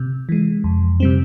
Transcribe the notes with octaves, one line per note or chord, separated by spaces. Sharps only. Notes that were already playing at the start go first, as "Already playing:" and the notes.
Already playing: C3
E3 G#3
F2
C3 G3 C4